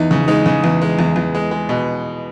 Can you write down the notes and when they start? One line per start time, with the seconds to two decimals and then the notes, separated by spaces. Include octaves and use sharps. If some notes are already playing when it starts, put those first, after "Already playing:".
Already playing: E2 D#4
0.11 C#3
0.28 G#3 D#4
0.46 C#3
0.64 E2
0.82 G#3
0.99 E2
1.16 E2
1.35 G#3
1.51 G#3
1.69 B2